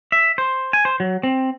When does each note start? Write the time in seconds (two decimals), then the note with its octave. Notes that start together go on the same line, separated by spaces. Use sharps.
0.12 E5
0.38 C5
0.73 G#5
0.85 C5
1.00 F#3
1.23 C4